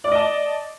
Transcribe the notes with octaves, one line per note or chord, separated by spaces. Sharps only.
D5 D#5 A5 D6